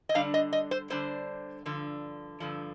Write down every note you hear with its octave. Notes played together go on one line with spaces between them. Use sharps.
D#5
D3 G3 D4 F5
D#5
D#5
C5
D3 G3 D4 C5
G2 D3 F3
G2 D3 F3